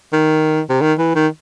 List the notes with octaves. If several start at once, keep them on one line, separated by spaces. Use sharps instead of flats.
D#3
C3
D#3
E3
D#3